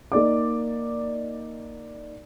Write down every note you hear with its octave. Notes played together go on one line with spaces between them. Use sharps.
A#3 D#4 D5 D6